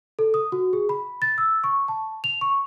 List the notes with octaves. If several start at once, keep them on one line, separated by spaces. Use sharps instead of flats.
A4
D#6
F#4
G#4
B5
A6
E6
C#6
A5
F7
C#6